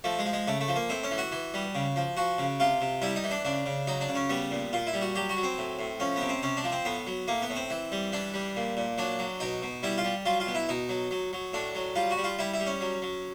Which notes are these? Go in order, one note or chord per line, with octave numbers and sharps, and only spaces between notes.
F3 A3
G#3
F3
G#3
C#3 A3
A3
F3
A#3
A2 C4
C#4
E3
F#4
E3
G3
C#3
F3
F3 F#4
C#3
C3 F4
C3
G3 E4
D#4
E3
D4
C#3 D4
C#3
F#3 D#4
D4
C#3
C#4
G3 B3
A#2
A#2 F4
E4
G3
F#4
F#3 G4
F#4
F#3
C4
A2
A2
F3 C#4
C3 B3
C4
C3 C#4
D4
F3
C4
A2 B3
F#3
A2 A#3
B3
A2
C4
E3
G3
E3 D4
G3
A#2
A#2
F#3 D4
F#3
B2 D#4
B2
G3 E4
F4
G3
F#3 F4
F4
B2
E4
B2 D#4
F#3
F#3
F#3
A2 D4
F#3
G3 F4
F#4
G3
F4
G3 E4
E4
G3
C#4
F#3
F#3